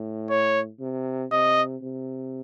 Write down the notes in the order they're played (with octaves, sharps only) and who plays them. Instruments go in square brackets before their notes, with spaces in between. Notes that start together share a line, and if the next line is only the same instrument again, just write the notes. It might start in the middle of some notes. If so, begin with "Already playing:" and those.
Already playing: [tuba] A2
[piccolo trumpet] C#5
[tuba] C3
[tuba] C3 [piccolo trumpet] D#5
[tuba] C3